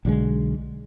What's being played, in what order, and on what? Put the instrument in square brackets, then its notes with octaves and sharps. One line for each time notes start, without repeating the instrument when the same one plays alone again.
[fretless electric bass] B1 D3 F3 G#3